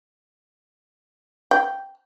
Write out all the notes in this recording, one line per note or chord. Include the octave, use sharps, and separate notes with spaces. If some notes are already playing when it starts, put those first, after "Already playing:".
G5